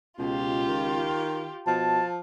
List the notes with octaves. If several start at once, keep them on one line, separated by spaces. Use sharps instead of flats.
C#2 B2 F4 G4
D#3
B2 F3 A5